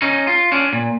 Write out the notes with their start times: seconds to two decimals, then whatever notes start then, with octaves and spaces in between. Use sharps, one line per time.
0.02 C#4 D#4
0.27 F4
0.52 C#4 D4
0.73 A#2